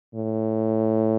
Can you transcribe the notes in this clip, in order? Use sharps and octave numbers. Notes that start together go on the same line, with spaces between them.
A2